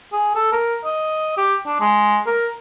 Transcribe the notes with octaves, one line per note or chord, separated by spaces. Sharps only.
G#4
A4
A#4
D#5
G4
D4
G#3
A#4